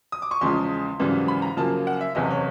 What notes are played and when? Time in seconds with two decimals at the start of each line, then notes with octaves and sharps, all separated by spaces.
0.12 D#6
0.22 D6
0.31 C#6
0.41 E2 C#3 F3 G#3 C6
1.00 G#1 F#2 C#3 E3 G3
1.28 B5
1.42 A#5
1.57 F#2 C#3 F3 A#3 A5
1.87 F#5
2.01 E5
2.15 F#1 E2 C3 E3 D#5
2.30 C#5